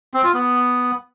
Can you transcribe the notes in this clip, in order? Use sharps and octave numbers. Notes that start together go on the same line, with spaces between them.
C4
F4
B3